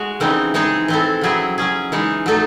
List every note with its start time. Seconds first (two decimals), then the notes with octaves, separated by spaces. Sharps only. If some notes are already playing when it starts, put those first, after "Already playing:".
Already playing: G#3 F#4
0.20 C#3 E3 C4 D#4
0.54 E3 G#3 D#4 G#4
0.88 E3 C4 E4 A4
1.21 C#3 F#3 C4 E4 G#4
1.58 F#3 C#4 G#4
1.92 E3 G#3 D#4
2.26 F#3 A3 D#4 A4